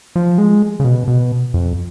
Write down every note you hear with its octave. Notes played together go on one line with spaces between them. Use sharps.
F3
G#3
C#3
B2
B2
F2